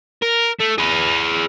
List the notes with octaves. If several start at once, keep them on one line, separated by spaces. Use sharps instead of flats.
A#4
A3
G#4 B4